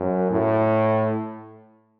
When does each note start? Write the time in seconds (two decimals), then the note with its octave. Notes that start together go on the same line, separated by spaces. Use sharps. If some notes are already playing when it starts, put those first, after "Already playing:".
Already playing: F#2
0.31 A2